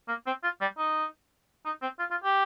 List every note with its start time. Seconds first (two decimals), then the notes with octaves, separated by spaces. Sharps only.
0.08 A#3
0.26 C4
0.43 F4
0.61 G3
0.78 D#4
1.65 D#4
1.82 C4
1.99 F4
2.11 F4
2.23 G4